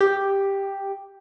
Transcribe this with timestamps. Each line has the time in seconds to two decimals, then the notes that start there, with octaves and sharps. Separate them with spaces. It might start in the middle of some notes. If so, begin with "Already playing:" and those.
0.01 G4